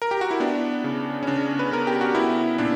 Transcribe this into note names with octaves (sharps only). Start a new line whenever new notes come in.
A#4
G4
F#4
E4
B3 D4
C#3
C#4
C#3 D4
B4
B3 A#4
G4
F#4
B3 E4
A#2 D4